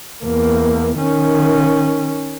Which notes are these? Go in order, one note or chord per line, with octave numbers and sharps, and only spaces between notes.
E2 A#3
D#3 C#4